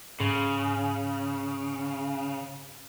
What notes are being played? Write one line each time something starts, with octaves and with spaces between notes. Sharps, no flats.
G#2 C#3